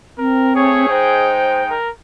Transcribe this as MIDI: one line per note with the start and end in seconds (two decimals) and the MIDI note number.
0.18 0.86 60
0.18 0.53 70
0.56 0.88 57
0.56 1.32 68
0.56 0.88 73
0.89 1.76 56
0.89 1.76 63
0.89 1.62 72
0.89 1.76 79
1.71 1.90 70